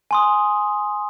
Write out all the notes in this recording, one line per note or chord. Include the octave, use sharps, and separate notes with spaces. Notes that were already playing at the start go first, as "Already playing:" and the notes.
G#5 C6 D#6